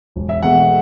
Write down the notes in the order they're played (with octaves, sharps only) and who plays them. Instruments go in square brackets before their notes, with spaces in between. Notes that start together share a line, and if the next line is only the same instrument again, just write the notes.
[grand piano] E1
E5
E2 B2 A3 F#5